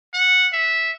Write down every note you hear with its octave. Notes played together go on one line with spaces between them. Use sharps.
F#5
E5